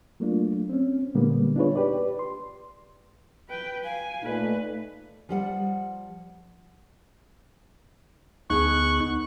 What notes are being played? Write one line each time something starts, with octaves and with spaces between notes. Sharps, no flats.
F#3 A3 A#3 D4 F4
C4 C#4
A#2 D3 G3 G#3 A#3 B3
D4 D#4 F4 G#4 B4 C#5
G4 B4 D5
C6
B4 G5
F5 G#5
A#2 A3 D#4 B4
F3 G3 F#5
D2 B3 D#4 G#4 A4 C#6 F#6